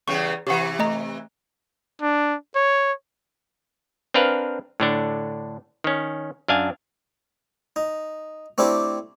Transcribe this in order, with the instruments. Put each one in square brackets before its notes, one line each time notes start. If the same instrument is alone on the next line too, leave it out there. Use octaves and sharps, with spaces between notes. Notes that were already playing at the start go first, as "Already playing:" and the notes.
[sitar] E2 C#3 G3 [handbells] C#6
[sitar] C3 E3 [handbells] G4 F#5
[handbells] A3 D#5 A#5
[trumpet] D4
C#5
[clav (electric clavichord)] C4 D4 A#4 B4 F5
A2 D3 D4
D#3 C#4
F#2 D4 F5 G#5
[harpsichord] D#4
A3 C4 D4 E4 G4